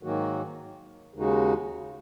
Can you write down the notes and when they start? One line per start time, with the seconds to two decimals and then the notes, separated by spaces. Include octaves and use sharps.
0.03 G#2 D#3 F#3 A#3 F#4
1.14 D#2 C#3 G#3 D#4 F#4